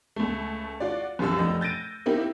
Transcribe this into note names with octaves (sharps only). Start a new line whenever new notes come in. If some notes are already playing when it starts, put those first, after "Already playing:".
C#2 A3
F4 F#4 D5
C2 F#2 C3 F3 C6 E6
F1 F3 D#5
G6 A6 A#6 D7 D#7
A#3 C4 D#4 E4 G4